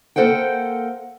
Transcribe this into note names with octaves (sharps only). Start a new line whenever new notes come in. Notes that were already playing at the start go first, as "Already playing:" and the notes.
A#3 A4 C5 F#5 G5